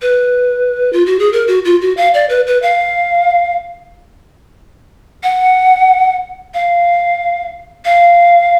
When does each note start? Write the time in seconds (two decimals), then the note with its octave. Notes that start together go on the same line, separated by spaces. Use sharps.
0.02 B4
0.93 F4
1.06 F#4
1.19 G#4
1.33 A#4
1.48 F#4
1.65 F4
1.81 F#4
1.97 F5
2.14 D5
2.29 B4
2.47 B4
2.62 F5
5.23 F#5
6.54 F5
7.85 F5